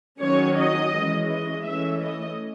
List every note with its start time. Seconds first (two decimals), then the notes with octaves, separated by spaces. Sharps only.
0.20 D#3 F#3 C#4 C#5
0.58 D#5
0.94 E3 G#3 C#4
1.30 D#5
1.66 E3 A3 C#4 E5
2.03 D#5